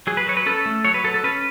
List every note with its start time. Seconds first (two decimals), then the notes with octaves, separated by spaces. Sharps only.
0.07 F#3 G#4
0.17 B4
0.27 F#3 C#5
0.37 B4
0.46 C#4 A4
0.66 A3
0.84 F#3 C#5
0.94 B4
1.04 F#3 A4
1.14 A4
1.24 C#4 B4